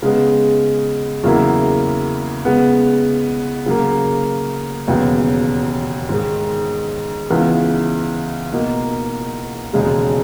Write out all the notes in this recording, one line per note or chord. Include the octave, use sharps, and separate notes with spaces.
C#3 G#3 B3
E2 C#3 F#3 A#3 E4
C#3 G#3 B3
C#3 F#3 A#3
E1 D#2 C#3 F#3 B3
G#2 D#3 G#3
C#2 C#3 E3 B3
B2 A#3 D#4
E1 D#2 C#3 G#3